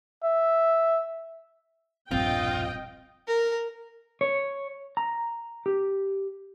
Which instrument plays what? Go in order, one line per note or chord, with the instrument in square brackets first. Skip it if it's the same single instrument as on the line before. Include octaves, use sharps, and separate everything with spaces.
[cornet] E5
[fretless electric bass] E1 A#1 G2 [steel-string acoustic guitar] C4 [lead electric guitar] F4 [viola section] D#5 G5
[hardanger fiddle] A#4
[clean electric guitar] C#5
A#5
G4